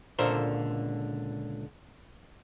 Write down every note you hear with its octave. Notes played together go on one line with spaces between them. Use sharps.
C#2 A#2 D3 A4 A#4 C5